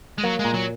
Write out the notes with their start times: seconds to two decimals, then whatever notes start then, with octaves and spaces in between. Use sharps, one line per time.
0.18 G#3
0.23 F#3 A#3
0.39 G#3
0.44 A#2
0.54 F#3